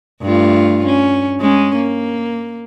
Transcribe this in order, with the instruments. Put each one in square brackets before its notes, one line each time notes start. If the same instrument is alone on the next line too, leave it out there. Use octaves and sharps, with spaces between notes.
[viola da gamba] G2 A3 F4
C#4
G#3 C#4
A#3